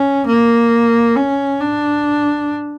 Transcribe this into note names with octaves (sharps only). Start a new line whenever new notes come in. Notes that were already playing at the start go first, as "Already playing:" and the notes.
Already playing: C#4
A#3
C#4
D4